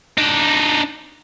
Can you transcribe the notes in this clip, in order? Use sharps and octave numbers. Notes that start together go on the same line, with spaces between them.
D4 D#4